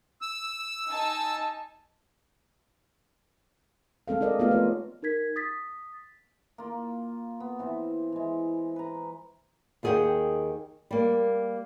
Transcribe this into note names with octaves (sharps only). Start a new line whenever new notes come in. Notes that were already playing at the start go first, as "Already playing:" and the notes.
E6
D#4 G#5 A5
G#3 C4 A4 F5
D#4 A#4 D5 D#5
A3 B3 D#4 F4 G4 F5
F4 C#5
D#4 A#4 G#6 B6
D#6 A6 B6
A#3 F4
B3
E3 C4 E4
E3 G#3
B4 A#5
D#2 D#3 G#4 D#5 F#5 G5
G3 A#3